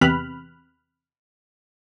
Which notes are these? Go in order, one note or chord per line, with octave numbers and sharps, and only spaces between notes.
E2 C3 B5 F6 F#6